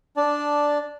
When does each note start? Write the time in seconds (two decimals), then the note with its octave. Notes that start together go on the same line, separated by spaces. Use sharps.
0.17 D4 D5 A5